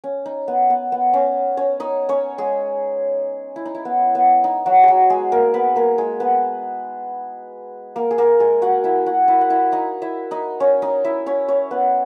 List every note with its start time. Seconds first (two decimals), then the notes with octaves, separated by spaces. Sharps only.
0.04 C#4
0.26 D#4
0.48 B3
0.70 B3
0.92 B3
1.13 C#4
1.57 C#4 C#5
1.80 D#4 D#5
2.09 C#4 C#5
2.38 G#3 G#4
3.56 E4
3.65 D#4
3.75 E4
3.85 B3
4.15 B3
4.44 D#4
4.66 F#3 F#4
4.83 F#3 F#4 G#4
5.10 G#3 G#4
5.32 A#3 A#4
5.54 B3 B4
5.76 A#3 A#4
5.98 G#3 G#4
6.20 B3 B4
7.96 A#3 A#4
8.11 G#4
8.18 A#3 A#4
8.40 G#3 G#4
8.62 F#4 F#5
8.84 E4 E5
9.06 F#4 F#5
9.28 E4 E5
9.41 F#5
9.50 E4 E5
9.72 D#4 D#5
10.02 E4 E5
10.31 D#4 D#5
10.60 C#4 C#5
10.82 D#4 D#5
11.04 E4 E5
11.26 C#4 C#5
11.48 C#4 C#5
11.71 B3 B4